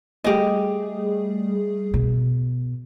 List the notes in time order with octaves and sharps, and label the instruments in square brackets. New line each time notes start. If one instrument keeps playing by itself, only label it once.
[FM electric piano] G3 A3 G#4 [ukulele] G4 D#5
[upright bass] B2